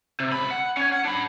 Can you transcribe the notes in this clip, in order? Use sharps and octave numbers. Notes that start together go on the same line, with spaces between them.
C3
C#2 B5
F#5
C#4 C#5
F#5
D4 B5